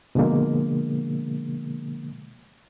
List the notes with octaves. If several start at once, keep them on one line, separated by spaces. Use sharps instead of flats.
B2 D3 F3 G#3 A#3